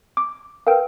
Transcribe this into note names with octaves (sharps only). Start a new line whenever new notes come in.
D6
A#4 B4 F5 G5